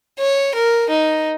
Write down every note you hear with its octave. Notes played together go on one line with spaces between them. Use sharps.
C#5
A#4
D#4